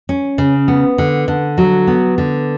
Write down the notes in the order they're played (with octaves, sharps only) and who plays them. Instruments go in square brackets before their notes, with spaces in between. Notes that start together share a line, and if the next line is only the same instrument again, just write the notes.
[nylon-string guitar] C#4
C#3
B3
D3
D3
F#3
B3
D3